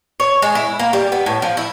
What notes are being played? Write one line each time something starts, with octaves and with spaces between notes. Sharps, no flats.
C#5
G#3
E4
A#3
G3
B3
A2
F3
E4